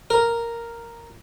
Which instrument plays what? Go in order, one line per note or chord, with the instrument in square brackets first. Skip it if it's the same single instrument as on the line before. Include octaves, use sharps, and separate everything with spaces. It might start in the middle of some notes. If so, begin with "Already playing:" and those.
[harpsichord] A#4